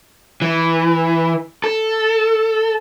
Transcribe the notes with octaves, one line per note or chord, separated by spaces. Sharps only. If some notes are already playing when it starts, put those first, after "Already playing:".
E3
A4